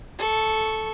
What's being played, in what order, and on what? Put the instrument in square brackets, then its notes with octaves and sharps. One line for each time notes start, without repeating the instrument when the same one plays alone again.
[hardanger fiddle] A4 C#6